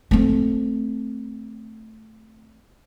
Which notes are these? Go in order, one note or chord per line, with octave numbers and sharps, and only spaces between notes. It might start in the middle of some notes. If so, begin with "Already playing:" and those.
A3 C4